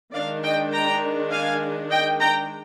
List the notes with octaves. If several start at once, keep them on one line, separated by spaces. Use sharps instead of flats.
D#3 G#3 D4 D5 F5
D#5 G5
G5 A#5
F5 G#5
D#5 G5
G5 A#5